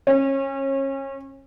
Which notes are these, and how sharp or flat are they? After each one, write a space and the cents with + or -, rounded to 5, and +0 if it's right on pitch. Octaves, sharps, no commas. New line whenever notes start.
C#4 -30